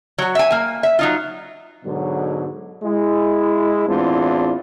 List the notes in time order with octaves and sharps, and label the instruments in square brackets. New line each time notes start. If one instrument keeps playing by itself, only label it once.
[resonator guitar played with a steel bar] F#3 F#4
E5 G#5
A#3 G#5
E5
F#3 D#4 F4
[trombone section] G#2 B2 D3 F#3
G#3 E4
E2 A2 C4 D4 E4 F4